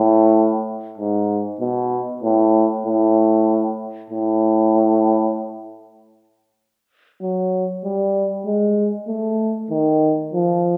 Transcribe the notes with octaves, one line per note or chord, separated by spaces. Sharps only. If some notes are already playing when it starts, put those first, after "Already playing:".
Already playing: A2
G#2
B2
A2
A2
A2
F#3
G3
G#3
A3
D#3
F3